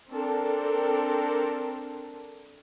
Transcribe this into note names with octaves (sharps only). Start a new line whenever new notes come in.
C4 D4 A4 A#4